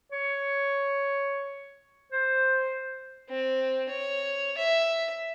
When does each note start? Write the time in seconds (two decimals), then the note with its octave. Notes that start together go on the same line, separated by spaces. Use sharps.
0.12 C#5
2.12 C5
3.30 C4
3.90 C#5
4.58 E5